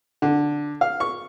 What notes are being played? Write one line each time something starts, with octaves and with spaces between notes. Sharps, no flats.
D3
F5
C#6